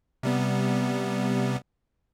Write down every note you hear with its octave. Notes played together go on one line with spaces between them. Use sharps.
C3 G3 B3